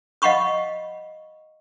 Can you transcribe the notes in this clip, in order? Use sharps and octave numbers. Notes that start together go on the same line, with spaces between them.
D#5 F5 F#5 B5 C#6 D#6